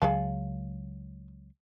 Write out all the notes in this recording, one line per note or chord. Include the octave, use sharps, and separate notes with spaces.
C#2 F#3 G#4 F5 A5